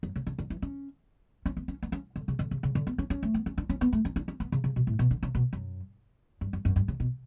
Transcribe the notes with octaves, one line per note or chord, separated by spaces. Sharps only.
F#2
C#3
C#3
D3
E3
C#4
C#4
B3
C#4
B3
C#4
D3
C#3
D3
C#3
C#3
D3
B3
C#4
C#4
A3
B3
C#4
D4
C#4
B3
A3
C#4
D4
C#4
B3
C#3
C#3
B2
A2
B2
D3
C#3
B2
F#2
G2
F#2
F#2
G2
C#3
B2